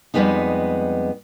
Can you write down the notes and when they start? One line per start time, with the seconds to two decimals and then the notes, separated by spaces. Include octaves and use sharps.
0.14 F2 B2 G3 G#3 B3 D#4